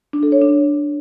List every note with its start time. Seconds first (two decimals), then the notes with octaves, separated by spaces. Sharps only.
0.13 D4
0.23 A4
0.32 C#5
0.42 D4